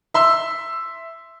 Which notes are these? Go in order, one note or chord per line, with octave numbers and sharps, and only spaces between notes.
E5 C6 E6